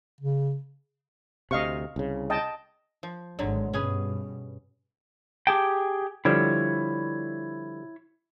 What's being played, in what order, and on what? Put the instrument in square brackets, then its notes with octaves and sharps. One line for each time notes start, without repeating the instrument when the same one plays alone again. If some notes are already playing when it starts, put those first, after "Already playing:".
[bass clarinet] C#3
[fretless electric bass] D2 C3 [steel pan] D#5 F5 C#6
[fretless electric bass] C2 C#3
[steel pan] D#5 G5 A5
[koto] F3
[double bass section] G#1 G#3 [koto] D3 F#3
[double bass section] G2 B2 [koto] C#4 G#4 B4
[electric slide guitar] G4 G#4 G5 [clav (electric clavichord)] A5
[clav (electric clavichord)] D3 F3 G3 [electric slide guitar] E4 C#5